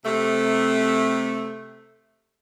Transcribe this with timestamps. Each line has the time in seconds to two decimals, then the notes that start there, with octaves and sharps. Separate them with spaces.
0.05 C3 A3